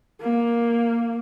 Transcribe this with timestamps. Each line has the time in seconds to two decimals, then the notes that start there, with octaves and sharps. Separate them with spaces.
0.21 A#3